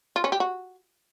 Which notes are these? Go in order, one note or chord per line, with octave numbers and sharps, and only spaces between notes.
F4
C#4
G4
F#4